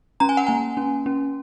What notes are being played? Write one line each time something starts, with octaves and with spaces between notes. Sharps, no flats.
C#4 A#5
G#5
F#5
A#3 G#5
C#4
C#4